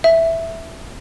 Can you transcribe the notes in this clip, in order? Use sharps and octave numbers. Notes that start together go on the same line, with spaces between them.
E5